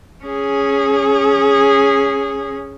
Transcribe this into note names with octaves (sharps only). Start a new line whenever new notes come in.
C#4 G#4